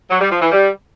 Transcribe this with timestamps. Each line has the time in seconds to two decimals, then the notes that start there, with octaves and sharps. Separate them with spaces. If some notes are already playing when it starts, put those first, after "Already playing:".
0.10 F#3
0.21 G3
0.31 F3
0.42 E3
0.52 G3